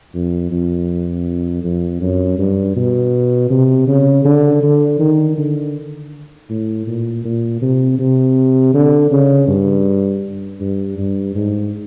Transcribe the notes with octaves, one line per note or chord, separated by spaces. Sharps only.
F2
F2
F2
F#2
G2
B2
C3
C#3
D3
D3
D#3
D3
A2
A#2
A#2
C3
C3
D3
C#3
G2
G2
G2
G#2